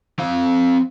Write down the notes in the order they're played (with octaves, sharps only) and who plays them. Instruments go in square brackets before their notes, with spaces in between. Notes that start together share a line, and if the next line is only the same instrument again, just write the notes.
[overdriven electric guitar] C4 F5